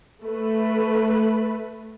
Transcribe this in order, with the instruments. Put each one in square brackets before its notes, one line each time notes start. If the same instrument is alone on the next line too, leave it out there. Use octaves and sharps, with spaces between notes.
[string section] A3 B4